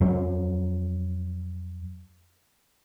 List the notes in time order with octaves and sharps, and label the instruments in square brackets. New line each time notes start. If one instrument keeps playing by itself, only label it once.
[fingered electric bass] F2 F#3